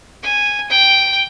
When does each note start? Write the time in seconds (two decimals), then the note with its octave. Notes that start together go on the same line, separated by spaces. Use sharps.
0.23 G#5
0.70 G5